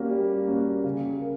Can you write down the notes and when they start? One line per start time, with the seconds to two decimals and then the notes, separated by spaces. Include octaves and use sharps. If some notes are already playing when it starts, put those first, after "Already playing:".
Already playing: G3 A#3 C#4 F#4 A#4
0.11 G3
0.47 A#3 C#4 F#4 A#4
0.84 C#3
1.21 A#4